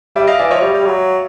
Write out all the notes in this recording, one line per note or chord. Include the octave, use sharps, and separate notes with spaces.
G3 D5 E5
D#5 F5
E3 D5 E5
F3 C#5 D#5
G3
G3
F#3